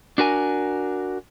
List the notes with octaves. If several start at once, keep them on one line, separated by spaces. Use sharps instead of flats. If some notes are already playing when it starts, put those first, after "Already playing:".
D4 F#4 A#4 G#5